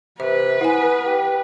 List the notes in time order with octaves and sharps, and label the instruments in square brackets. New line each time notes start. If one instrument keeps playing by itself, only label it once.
[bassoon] C3 [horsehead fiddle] B4 [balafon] E5
[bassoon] B3 [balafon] E4 G#5
[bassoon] G4